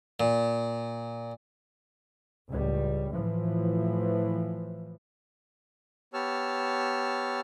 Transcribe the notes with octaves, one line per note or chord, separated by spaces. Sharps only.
A#2
C#2 A2 G3
A2 E3 F3
B3 G4 C#5 A5 E6 F6